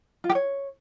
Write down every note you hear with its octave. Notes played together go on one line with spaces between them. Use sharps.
F4
G4
C#5